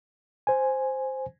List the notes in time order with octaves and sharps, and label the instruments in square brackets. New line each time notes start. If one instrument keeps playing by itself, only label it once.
[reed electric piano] C5 G#5